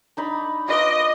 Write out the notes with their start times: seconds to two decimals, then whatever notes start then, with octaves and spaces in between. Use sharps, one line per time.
0.17 D4 D#4 B5
0.68 F4 B4 D#5 D6